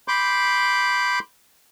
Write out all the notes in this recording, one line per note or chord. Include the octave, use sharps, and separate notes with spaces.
B5 C6 D6 G6